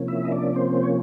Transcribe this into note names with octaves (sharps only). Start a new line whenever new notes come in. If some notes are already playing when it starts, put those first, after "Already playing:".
Already playing: C3 F3 A#3 C#4
E4 E5
D#5
D4 D5
C4 C5
C#5